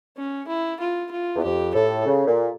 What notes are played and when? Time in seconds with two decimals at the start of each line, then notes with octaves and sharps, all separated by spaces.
0.16 C#4
0.48 E4
0.80 F4
1.11 F4
1.35 E2
1.43 F2 G4
1.74 A2 A4
2.06 C#3
2.27 A#2